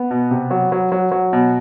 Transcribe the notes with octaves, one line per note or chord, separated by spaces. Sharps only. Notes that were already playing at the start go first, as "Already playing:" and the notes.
Already playing: B3
B2
C3
F#3
F#3
F#3
F#3
B2